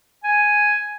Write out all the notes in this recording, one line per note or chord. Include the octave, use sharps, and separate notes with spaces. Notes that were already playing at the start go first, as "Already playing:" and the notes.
G#5